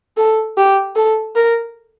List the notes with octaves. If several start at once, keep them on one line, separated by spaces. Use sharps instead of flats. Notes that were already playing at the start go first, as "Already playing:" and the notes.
A4
G4
A4
A#4